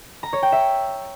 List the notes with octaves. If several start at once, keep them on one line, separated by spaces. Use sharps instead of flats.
A#5
C#5
G5
E5